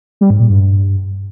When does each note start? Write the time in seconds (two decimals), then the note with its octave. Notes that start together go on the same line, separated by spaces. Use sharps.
0.21 G3
0.30 G#2
0.40 A#2
0.49 G2